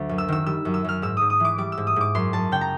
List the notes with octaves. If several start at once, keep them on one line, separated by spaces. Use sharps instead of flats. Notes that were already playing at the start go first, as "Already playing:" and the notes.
Already playing: D2 F#3
F#2
E6
D#3 E6
G3 E6
F#2
E6
F#2 F6
G#2 E6
G#2 D#6
D#6
E3 D6
G3 D6
E6
G#2
D#6
G#2 D6
F#2 C6
F#2 A5
C#3 G5
A#5